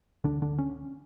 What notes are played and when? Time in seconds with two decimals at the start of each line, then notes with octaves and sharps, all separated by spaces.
0.24 D2 D3 D4
0.42 D3 D4
0.58 C#4